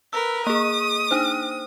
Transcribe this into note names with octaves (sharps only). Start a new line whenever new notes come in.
A#4 B4 E6
A#3 G#4 D#6
D4 D#4 C5